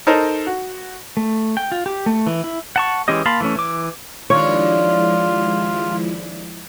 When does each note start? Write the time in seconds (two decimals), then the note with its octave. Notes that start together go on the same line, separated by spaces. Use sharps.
0.07 D#4 A4 A#4 C5
0.47 F#4
1.17 A3
1.57 G5
1.72 F4
1.86 G4
2.06 A3
2.27 E3
2.44 E4
2.76 F#5 A5 C#6
3.08 E3 G#3 C#4 G4 D#5
3.26 A#3 F5 A5 B5 C6
3.40 E3 A3 C#4
3.56 E3 D6
4.30 D#2 F3 G#3 D4 E4 F4 C#5